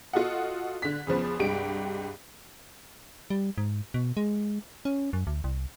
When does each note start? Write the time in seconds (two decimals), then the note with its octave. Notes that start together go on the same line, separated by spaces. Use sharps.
0.13 F4 F#4 A4 D#5 F#5
0.82 D3 B6
1.07 E2 C#3 F3 B3
1.39 C2 G2 G#3 G4 D7
3.30 G3
3.58 G#2
3.94 B2
4.17 G#3
4.85 C#4
5.13 F#2
5.27 D2
5.44 C2